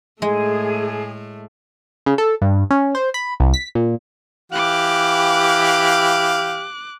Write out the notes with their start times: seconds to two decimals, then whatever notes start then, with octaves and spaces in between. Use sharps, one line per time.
0.22 A2 G#3 A3 G#4
2.06 C#3
2.18 A4
2.41 G2
2.71 C#4
2.95 C5
3.14 B5
3.40 C2
3.54 B6
3.75 A#2
4.52 E3 G4 F5 D6 F#6